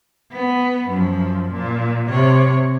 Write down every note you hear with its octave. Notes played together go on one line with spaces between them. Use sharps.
B3
F#2 F3
A#2
C3 C#5